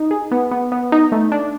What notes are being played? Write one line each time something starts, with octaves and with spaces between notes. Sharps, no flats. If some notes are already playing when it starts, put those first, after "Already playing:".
Already playing: D#4
G#4
B3
B3
B3
D#4
A3
D4